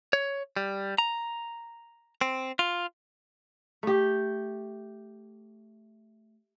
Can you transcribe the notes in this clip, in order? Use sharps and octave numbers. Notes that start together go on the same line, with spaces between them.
C#5
G3
A#5
C4
F4
A3 G4